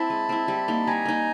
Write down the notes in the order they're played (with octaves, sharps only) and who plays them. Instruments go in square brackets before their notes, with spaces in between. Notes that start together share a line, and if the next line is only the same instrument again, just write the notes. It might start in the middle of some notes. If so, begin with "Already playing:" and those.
Already playing: [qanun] C4 E4 [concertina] A5 B5
[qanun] G#3
C4 E4
G3
A#3 D#4
[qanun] G3 [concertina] G#5 A#5
[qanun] A#3 D#4